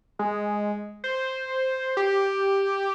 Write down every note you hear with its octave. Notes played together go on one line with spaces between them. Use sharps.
G#3
C5
G4